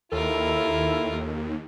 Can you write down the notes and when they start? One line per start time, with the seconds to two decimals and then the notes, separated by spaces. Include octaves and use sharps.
0.12 D#2 E4 F4 A4 A#4